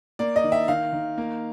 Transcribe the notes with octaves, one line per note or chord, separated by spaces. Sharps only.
A#3 D5
D#5
D#3
E5
D#3 F5
D#3
A#3